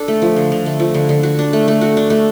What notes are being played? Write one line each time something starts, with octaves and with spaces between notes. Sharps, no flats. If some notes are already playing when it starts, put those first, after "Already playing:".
Already playing: D4 A4
A3
F3
D3
D3
A3
F3
D3
D3
F#4
D4
A3
A3
F#4
D4
A3